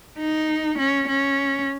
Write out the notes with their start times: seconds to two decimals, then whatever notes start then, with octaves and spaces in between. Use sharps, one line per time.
0.19 D#4
0.78 C#4
1.08 C#4